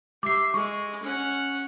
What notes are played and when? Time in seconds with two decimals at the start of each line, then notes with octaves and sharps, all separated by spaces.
0.23 G4 E5 D6 C7
0.54 G#3 C#6
1.03 C#4 F#5